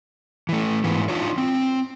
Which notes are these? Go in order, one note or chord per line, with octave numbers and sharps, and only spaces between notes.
E3 A3
G#2 E3 B3
D4 D#4 F4 C#5
C4